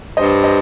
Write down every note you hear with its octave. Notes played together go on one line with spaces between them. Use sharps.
G2 C5 D#5
C5 D#5